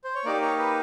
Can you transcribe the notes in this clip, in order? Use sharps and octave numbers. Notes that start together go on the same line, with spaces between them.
C5
C#5
A#3 D#4 G4 D5
C#5
B4